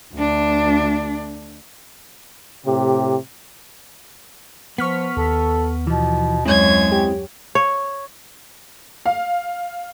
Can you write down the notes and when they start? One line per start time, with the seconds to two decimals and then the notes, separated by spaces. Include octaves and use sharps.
0.14 D2 D4
2.66 A2 C3 G4
4.78 F3 B3 C#6 F6 B6
5.17 D#2 A4
5.87 B2 E3 F3
6.45 F#2 G#3 C4 E4 G#4 C#5 G#6
6.92 G4
7.55 C#5
9.06 F5